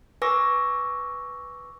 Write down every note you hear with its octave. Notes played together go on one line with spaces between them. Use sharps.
B4 G#5 C#6 D6 E6 A#6